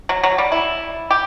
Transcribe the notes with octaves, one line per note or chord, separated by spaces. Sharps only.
F#3
F#3
G3
E4
G4